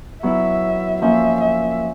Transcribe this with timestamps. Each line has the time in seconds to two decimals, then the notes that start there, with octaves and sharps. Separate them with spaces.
0.23 F#3 B3 E4 E5
1.02 F3 A#3 C#4 E5
1.40 E5